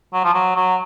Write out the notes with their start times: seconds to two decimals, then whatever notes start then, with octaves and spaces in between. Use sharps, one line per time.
0.14 F#3
0.24 F3
0.34 F#3
0.56 F#3